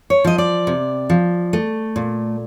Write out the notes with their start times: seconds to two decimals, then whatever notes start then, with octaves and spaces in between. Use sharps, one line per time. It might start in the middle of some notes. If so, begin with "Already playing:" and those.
0.10 C#5
0.24 F3 D#5
0.38 D5
0.67 C3
1.10 F3
1.53 A3
1.96 A#2